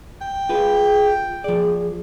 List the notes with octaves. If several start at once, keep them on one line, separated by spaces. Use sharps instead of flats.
G5
F4 G#4 B4
F3 G#4 D5